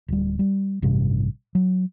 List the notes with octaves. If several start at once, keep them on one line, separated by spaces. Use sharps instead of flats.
D1 G3
G3
A1 G2 C3
F#3